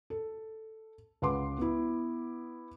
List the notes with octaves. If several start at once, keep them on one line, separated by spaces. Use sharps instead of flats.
A4
C#2 B4 F#5 C6 D6
B3 E4